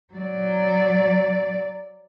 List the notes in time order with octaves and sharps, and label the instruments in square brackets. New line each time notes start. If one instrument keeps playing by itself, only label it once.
[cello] F#3 D5